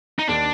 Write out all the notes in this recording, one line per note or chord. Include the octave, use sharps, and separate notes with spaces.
D#4
D#2 D4